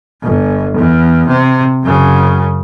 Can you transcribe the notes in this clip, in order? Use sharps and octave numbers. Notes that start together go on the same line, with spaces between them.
G1
E2
C3
F#2 C#3